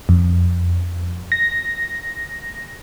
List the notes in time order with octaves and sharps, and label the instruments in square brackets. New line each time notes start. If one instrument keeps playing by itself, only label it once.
[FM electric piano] F2
A#6